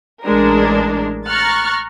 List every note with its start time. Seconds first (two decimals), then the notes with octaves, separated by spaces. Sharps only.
0.23 A1 G#3 D4 A#4
1.27 A#5 C#6 F6 F#6 A6